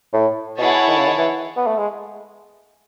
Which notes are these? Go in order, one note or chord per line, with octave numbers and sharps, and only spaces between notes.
A2
B2 E4 G#4 C#5 F#5 A5
D#3
C#3
D#3
E3
B3
A3
G#3